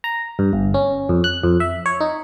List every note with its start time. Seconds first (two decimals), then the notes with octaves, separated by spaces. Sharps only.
0.04 A#5
0.39 G2
0.53 G1
0.74 C#4
1.09 F2
1.24 F#6
1.43 F2
1.60 E5
1.86 C#5
2.01 D#4